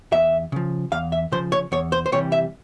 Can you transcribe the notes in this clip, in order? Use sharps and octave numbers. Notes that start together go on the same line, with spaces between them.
E2 E5
C#3 F3
E2 F5
E5
C#3 F3 C5
C#5
E2 C#5
C5
C5
C3 E3 G3 C#5
E5